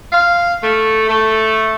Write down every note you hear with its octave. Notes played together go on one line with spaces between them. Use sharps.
F5
A3
A3